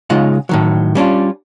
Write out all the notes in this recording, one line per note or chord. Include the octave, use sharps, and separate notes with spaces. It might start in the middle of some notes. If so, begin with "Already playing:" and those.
C#3 G#3 D#4 F4 F#5
A2 D#3 F#3
G3 C#4 D4 F4